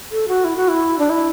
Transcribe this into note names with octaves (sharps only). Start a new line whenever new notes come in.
A4
F#4
E4
F#4
E4
D4
E4